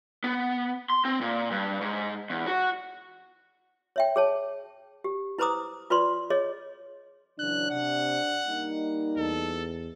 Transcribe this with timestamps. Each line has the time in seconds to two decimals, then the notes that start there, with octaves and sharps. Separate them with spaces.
0.24 B3
0.90 C6
1.05 C4
1.21 A#2
1.51 G2
1.81 G#2
2.30 E2
2.47 F#4
3.96 C#5 E5 G5
4.16 G#4 C#5 A5
5.04 G4
5.38 E4 B4 C5 A#5 D6 D#6
5.90 F4 B4 D5 C6
6.30 G#4 C#5 D#5
7.39 C#3 E3 F#3 D4 F#6
7.71 C3 F#5
8.47 G3 A#3 D#4
9.17 E2 A4